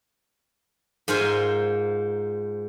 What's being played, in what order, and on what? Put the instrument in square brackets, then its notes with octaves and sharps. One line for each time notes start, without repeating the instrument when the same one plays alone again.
[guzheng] G#2 F4 A#4 C5 G#5